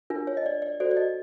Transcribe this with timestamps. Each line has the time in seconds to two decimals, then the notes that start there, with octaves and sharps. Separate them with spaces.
0.10 D4 F4 A#4
0.27 C#5
0.37 D#5
0.46 D5
0.62 D5
0.80 F#4 A4 C5 D5
0.91 D5
0.97 D#5